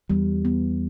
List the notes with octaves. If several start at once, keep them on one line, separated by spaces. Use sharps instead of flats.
E2 G3
B3